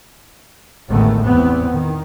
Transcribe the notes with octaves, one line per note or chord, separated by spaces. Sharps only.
A1 D2 D#3 G#3 A3 B3
E2 A2 B3 C4
D#3